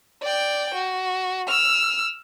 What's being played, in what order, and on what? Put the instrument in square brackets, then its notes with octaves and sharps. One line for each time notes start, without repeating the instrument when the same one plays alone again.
[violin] D5 G5
F#4
E6 F6